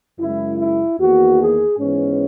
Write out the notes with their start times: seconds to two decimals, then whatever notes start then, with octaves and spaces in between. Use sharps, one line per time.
0.19 F#2 C#3 G#3 E4
0.60 E4
1.00 E2 D#3 A#3 F#4
1.40 G#4
1.79 G#2 E3 B3 C#4